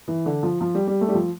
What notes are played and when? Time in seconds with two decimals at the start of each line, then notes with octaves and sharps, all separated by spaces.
0.08 E3
0.26 D3
0.43 F3
0.61 F3
0.75 G3
0.88 G3
1.01 A3
1.09 G3
1.14 F3